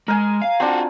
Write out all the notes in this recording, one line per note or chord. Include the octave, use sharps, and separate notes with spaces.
G#3 A#4 G#5
F5
C4 D4 F4 F#4